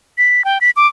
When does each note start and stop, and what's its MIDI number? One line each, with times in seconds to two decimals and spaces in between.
0.18 0.45 95
0.45 0.58 79
0.61 0.70 95
0.76 0.87 86